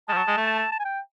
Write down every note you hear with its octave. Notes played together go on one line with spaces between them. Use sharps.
F3 G#3 A5
F#3
G#3
A3
A5
A5
A5
G#5
G5